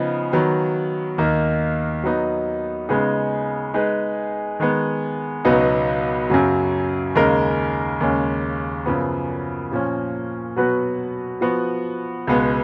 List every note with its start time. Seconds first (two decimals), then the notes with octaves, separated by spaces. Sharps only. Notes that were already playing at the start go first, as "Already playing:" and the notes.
Already playing: C#3 F3 B3 D#4
0.33 D#3 F#3 B3
1.18 D#2 D#3 A#3 D#4
2.04 F#3 B3 D#4
2.89 C#3 G#3 B3 D#4 G#4
3.74 G#3 D#4 G#4 B4
4.60 D#3 G#3 B3
5.45 C#2 B2 F#3 B3 D#4
6.30 F#2 C#3 F#3
7.15 D#2 C#3 G#3 D#4 A#4
8.00 D#2 C#3 G#3 C#4
8.86 F#2 C#3 F3 B3
9.71 A#2 F3 A#3 C#4
10.56 B2 F#3 B3 F#4 B4
11.41 F3 B3 F#4
12.27 C#2 B2 G#3 B3